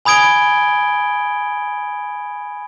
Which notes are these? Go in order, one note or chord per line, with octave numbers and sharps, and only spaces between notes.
G#5 B5 D#6 G#6 D7 G7